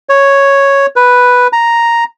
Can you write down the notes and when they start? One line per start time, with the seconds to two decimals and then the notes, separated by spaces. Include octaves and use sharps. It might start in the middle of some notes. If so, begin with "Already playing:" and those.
0.09 C#5
0.96 B4
1.53 A#5